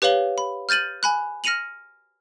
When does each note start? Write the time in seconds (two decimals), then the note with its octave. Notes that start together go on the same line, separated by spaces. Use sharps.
0.02 G4 B4 C#5 F5 F#7 G7
0.38 B5
0.69 F6 G6 A6 D#7 F#7
1.03 G#5 B5 F#6
1.44 F6 A#6 C#7 D#7 F7 F#7